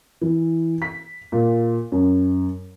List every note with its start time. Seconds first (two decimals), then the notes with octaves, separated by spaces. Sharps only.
0.21 E3
0.82 B6
1.32 A#2
1.92 F#2